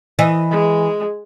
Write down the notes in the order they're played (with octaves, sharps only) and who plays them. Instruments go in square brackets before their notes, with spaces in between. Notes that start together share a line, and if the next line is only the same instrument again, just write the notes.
[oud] E3 D#5
[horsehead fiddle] G#3